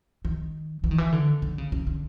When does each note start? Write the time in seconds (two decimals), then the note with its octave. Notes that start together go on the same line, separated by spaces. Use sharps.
0.25 D#3
0.84 E3
0.91 D#3
0.98 E3
1.12 D3
1.42 D3
1.58 C#3
1.72 C#3
1.87 D3